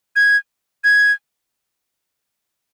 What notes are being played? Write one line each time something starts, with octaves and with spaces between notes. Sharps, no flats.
G#6
G#6